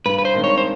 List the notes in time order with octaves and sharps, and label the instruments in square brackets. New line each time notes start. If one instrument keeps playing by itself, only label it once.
[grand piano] G2 [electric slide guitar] B4
[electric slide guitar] B4
C5
[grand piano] D#3 G#3 C4 D#4
[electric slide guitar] C#5
C5